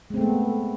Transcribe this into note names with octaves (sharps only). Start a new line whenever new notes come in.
G#3 A3 B3 C4